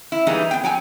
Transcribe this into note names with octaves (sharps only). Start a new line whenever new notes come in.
E4
E3 G3 G#3 A#3 D#4
B3 G5
F#3 G5 G#5